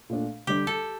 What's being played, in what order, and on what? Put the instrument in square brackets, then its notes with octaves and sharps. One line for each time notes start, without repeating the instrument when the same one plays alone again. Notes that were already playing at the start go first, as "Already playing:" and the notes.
[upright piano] A#2 A3 D4
[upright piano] D3 G3 D4 [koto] G4
[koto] A4